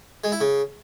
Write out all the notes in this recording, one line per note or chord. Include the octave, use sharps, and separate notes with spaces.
G#3
E4
C#3